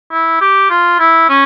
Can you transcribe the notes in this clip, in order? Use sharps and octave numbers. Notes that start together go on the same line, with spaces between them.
E4
G4
F4
E4
C#4